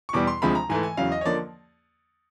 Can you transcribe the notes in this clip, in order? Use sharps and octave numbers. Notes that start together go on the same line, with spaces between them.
C#6
E2 B2 G3 D6
C6
D2 C3 F3 G#3 B5
A#5
G#2 E3 A3 G#5
G#5
E2 C#3 F#3 F5
D#5
C#5
D3 F3 A#3 D5